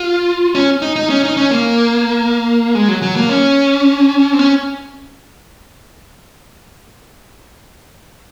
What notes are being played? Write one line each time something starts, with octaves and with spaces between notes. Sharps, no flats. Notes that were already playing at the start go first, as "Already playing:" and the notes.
Already playing: F4
C#4
D#4
D#4
C#4
D#4
C#4
A#3
G#3
F#3
F#3
A#3
C#4
C4
C#4